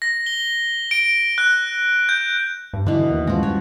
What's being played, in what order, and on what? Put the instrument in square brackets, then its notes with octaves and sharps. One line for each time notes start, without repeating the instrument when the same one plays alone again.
[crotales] A#6
G7
D7
F#6
G6
[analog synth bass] G2
[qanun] B2 E3 [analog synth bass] D3
[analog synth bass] D#2
[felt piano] C#2 G2 [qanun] F3 F#4
[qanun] C#5